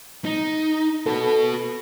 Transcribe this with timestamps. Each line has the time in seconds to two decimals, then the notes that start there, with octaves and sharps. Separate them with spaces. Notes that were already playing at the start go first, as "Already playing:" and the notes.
0.25 D#4
1.06 F#4 A4 B4